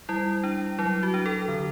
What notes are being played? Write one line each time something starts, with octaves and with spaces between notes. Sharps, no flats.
G3 E4
D4
F#3 E4
F#4
D4
A4
D3